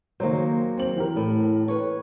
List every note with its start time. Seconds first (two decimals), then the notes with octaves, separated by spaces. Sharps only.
0.20 D#3 F#3 G#3 A#3 C5
0.78 C4 F#7
0.96 E3 G4 A#4
1.16 A2
1.68 B4 C#5